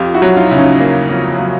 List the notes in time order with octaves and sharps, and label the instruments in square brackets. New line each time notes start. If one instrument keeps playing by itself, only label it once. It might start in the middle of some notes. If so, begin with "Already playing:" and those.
Already playing: [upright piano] F2 [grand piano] F4 G4
[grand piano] E4 F#4
[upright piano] F#3
[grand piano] D#4 F4
[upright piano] C#3 [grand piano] E4
[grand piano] C#4 D#4
[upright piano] A#3
F2
F#3